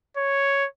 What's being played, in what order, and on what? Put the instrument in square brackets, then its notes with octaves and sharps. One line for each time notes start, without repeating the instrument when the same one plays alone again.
[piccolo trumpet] C#5